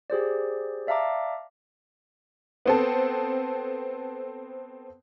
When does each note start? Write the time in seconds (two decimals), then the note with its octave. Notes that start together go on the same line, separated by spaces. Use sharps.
0.10 G4 G#4 C5 D5
0.87 D5 E5 F5 A5 A#5 D6
2.66 B3 C4 A4